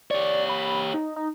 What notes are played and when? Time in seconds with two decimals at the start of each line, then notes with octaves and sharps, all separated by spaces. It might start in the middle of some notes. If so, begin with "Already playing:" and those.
0.11 G4 C#5 D5
0.49 B5
0.94 D#4
1.16 D#4